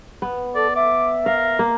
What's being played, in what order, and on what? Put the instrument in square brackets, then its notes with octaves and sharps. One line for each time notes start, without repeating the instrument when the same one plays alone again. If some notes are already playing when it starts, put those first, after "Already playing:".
[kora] B3
[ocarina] A4 [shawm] D5
[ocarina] E5 [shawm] D6
[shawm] A#4 [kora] F5
[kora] A#3